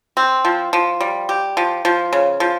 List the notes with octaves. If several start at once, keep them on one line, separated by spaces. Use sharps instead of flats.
C4
F3
F3
G3
G4
F3
F3
C#3
F3